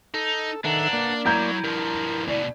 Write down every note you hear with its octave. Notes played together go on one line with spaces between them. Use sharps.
D#4 A4
D#3 D4 A4 B4 E5 F#5 A#5
A#3 D5
F#2 F#3 E4 A#5 G6 G#6
G2 F3 A#4
D2 B2 D5